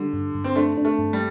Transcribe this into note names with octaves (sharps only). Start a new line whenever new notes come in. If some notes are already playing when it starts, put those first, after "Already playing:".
Already playing: D3 G3
G2
G2
C4
A3 D4
D4
A3
G2
G3